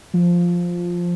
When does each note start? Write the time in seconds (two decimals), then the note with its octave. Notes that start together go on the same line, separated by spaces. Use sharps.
0.14 F3